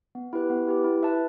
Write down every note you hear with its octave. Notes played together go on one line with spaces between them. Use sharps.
B3
E4 G4 B4
B3
E4 G4 B4
E4
B4 E5 A5